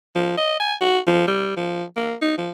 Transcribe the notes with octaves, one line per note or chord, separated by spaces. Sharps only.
F3
D#5
G#5
F#4
F3
G3
F3
A#3
D#4
F3